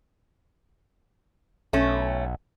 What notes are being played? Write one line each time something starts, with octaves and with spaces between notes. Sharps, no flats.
B1 A3 C#4